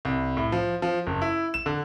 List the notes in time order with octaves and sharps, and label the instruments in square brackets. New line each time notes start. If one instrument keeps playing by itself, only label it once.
[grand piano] C2
A2
F3
F3
F#1
E4
E7
D3